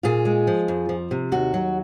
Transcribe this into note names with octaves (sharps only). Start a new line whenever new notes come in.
A#2 F4 G#4
G#3
F3
F2
F3
C3
D#2 F#4
F#3